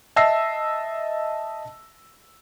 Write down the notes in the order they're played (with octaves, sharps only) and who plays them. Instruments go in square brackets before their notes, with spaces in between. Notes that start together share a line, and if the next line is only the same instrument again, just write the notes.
[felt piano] D#5 E5 A5 E6 A#6 C7